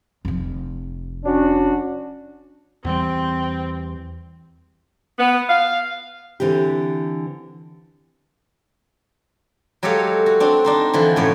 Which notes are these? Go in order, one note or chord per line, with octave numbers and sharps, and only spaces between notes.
F1 F3
C#4 D4 F#4
E2 E3 G3 C4
B3
F5
D3 E3 C4 G4
F#3 G#3 G4 A4 C#5 F5
F#4
C4 D4
D4 D#4 C5
D3 E3 F3
F#2 A2 C#5